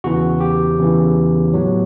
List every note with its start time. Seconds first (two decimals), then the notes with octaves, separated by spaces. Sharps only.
0.04 E2 C#3 E3 F#4
0.40 G4
0.79 E2 C#3 E3
1.53 A2 F#3 B3